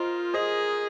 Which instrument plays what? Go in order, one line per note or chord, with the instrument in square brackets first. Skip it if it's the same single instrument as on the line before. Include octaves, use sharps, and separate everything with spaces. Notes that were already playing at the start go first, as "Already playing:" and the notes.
Already playing: [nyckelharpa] F4 [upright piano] A#4 C5 D#5
[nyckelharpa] G#4 [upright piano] C5 D#5